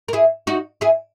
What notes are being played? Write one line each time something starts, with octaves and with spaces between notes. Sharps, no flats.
A#4
E4 G#4
D#4 F#4
E4 G#4